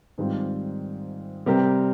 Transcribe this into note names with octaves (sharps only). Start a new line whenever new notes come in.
G#2 D#3 G3 C4 F4
C3 G3 C4 G4 A#4